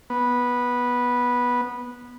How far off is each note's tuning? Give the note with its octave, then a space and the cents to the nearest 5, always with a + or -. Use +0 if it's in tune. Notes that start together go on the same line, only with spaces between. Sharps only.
B3 -10